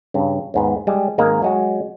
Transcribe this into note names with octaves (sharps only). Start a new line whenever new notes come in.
G2 C#3
D#2 G#2 B3
G3 G#3
G#1 G#3 A#3 D#4
F#3 G#3 F#4